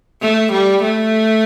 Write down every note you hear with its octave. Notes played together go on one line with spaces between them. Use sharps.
A3
G3
A3